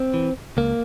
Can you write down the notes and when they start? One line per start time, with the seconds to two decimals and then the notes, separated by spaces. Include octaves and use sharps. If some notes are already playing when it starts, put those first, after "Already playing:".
Already playing: C4
0.14 E3
0.57 C#2 A#3